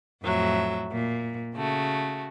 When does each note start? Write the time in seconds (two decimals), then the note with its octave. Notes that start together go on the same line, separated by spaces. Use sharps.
0.22 F2 A2 F#3 E5
0.91 A#2
1.55 C#3 A3 F#4